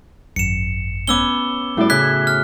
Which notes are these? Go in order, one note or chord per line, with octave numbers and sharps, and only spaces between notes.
G#1 F#2 C#7 E7
B3 C#4 D6 E6 G7
A2 G3 E4 F#4 D5
C#3 E5 F#6 G#6 B6
F6